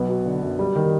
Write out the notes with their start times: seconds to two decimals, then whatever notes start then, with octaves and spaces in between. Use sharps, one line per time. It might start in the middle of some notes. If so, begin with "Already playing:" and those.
Already playing: B1 B3
0.09 F#3
0.25 D3
0.42 F#2
0.59 G3
0.76 D#3